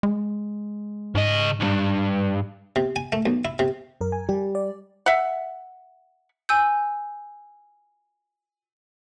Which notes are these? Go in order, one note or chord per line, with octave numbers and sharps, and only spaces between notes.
G#3
G#2 C#3 D#5
B1 G2
C3
G#5
A3
B1
E4
C3
F#2 A#4
G#5
G3 G4
D5
E5 F#5
G#5 E6 G6